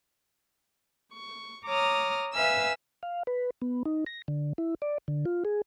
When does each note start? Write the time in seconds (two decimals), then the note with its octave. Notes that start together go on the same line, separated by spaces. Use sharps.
1.14 C#6
1.66 C#5 A#5 D6 D#6 F6
2.34 B4 E5 F5 G#5 E6
3.03 F5
3.27 B4
3.62 B3
3.85 D#4
4.06 A#6
4.28 D3
4.58 E4
4.82 D5
5.08 D3
5.26 F4
5.45 G#4